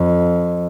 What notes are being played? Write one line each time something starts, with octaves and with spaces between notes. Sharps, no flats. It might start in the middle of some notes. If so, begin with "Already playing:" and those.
Already playing: F2